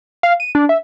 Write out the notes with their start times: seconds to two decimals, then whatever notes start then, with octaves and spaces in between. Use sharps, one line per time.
0.23 F5
0.40 D#7
0.55 D4
0.69 E5